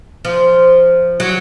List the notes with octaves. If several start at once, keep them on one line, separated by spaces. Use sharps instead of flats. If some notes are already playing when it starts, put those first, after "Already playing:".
F3
F#3